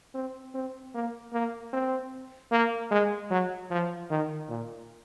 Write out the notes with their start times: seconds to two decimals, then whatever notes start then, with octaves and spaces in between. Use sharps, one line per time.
0.14 C4
0.54 C4
0.94 A#3
1.33 A#3
1.73 C4
2.52 A#3
2.91 G#3
3.31 F#3
3.71 F3
4.10 D#3
4.49 A#2